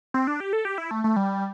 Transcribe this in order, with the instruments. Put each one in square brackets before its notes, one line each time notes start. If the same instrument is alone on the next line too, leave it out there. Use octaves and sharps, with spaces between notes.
[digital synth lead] C4
D4
G4
A4
G4
E4
A3
A3
G3